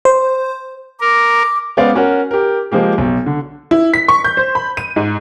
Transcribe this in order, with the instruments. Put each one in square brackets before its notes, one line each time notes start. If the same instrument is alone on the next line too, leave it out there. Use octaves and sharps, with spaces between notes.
[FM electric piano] C5
[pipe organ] A#4 [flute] D6
[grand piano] G#3 B3 C#4 C5 D5 F5
C#4 F#4 A#4
G4 A#4
F3 G#3 A#3 G4
B1
D3
[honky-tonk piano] E4
B6
C#6
G6
C5
B5
D#7
G#2